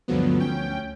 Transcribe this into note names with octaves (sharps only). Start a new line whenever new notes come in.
D2 G2 D3 F3 F#3 B3
D2 C#4 G5